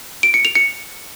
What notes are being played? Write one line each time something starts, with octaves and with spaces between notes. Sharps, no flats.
D7
C#7
F7
C#7